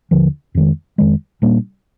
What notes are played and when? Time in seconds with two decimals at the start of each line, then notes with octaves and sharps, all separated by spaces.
0.11 D#2 D3 F3
0.55 F2 D#3 G#3
0.98 F2 D#3 G#3
1.42 A#2 G3 A#3 D4